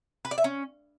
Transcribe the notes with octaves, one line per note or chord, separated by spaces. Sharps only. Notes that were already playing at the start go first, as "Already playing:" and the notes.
B4
D5
E5
C#4